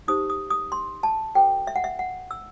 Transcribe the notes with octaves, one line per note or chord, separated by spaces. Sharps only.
D#4 G4 C5 D#6
D#6
D#6
C6
A5
F#4 A4 C5 G5
E5
F#5
E5
F#5
E6